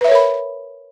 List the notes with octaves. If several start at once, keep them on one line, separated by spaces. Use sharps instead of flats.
A#4 B4 C#5 E5 B5